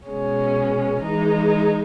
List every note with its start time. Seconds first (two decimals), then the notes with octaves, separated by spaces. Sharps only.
0.08 B2 G#3 C#4
1.01 E3 G#3 D#4